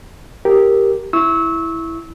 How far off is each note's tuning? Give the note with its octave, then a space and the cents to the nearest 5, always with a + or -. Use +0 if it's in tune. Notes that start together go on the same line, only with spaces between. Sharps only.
G4 +0 A#4 +0
E4 +0 C#6 -10 E6 -25